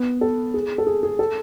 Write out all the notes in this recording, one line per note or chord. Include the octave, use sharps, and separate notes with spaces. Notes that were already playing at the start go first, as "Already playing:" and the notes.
Already playing: B3 B4
A4
G#4
A4
G#4
G#4
A4